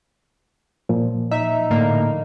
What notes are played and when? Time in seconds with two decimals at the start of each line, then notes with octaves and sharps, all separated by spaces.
0.89 A#2 F3
1.32 D#4 E5
1.70 A2 D3 A#3